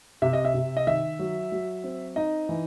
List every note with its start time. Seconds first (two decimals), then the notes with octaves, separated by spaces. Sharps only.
0.22 C3 E5
0.33 D#5
0.45 E5
0.54 C3
0.77 D#5
0.87 D#3 E5
1.19 F#3
1.52 F#3
1.84 C4
2.16 D#4 D#5
2.49 E3